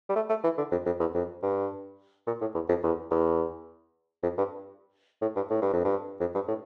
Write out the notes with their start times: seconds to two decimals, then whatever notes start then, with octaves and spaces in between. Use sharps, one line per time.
0.09 G3
0.16 A3
0.29 A3
0.44 E3
0.58 D3
0.72 F2
0.86 F2
1.00 E2
1.14 F2
1.43 G2
2.27 A#2
2.41 A2
2.54 E2
2.69 F2
2.83 E2
3.11 E2
4.23 F2
4.38 G2
5.22 A2
5.36 G2
5.50 A2
5.62 G2
5.73 F2
5.85 G2
6.20 F2
6.35 G2
6.48 A2